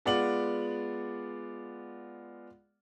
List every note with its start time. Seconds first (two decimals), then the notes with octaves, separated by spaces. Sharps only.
0.06 G#3 B3 F4 D5 F#5 F#7